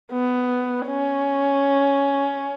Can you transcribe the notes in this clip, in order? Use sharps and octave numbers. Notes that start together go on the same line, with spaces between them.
B3
C#4